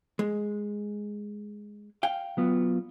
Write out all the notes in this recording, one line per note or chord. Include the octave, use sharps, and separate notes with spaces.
G#3
F5 G5
F#3 B3 F4